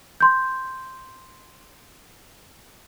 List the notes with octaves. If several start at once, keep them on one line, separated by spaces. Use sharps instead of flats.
C6 G6